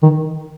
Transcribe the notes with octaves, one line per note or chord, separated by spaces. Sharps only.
D#3